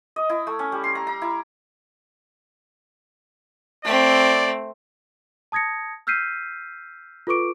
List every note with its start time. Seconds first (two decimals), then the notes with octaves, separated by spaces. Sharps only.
0.16 D#5
0.29 E4
0.47 A3
0.59 C#4
0.72 G3
0.84 C6
0.95 A#5
1.07 A#5
1.22 E4
3.85 A3 C4 D5
5.52 A5 D#6 G#6 A#6 C#7
6.07 E6 F6 G6 B6 C7 D#7
7.27 F4 A4 B4 C#6 D6 D7